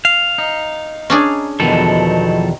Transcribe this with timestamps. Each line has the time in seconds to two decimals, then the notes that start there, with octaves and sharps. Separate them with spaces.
0.05 F5
0.38 D#4
1.10 C#4 D4 G#4
1.60 E2 B2 D#3 F3 F#3 A4